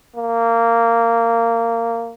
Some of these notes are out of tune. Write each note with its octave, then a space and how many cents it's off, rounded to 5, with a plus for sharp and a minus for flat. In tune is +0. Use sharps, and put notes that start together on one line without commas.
A#3 -15